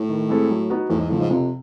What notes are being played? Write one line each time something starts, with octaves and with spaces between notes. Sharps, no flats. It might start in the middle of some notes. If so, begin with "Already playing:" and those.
Already playing: A2
D#3
G#3 C4 E4 A4
F#3
B3 D#4 F#4
E2 A2
G#2
A2 C#3 F3
G#2
F2 C3